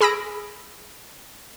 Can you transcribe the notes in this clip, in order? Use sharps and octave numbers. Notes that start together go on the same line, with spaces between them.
G#4 B5 E6 A#6 D7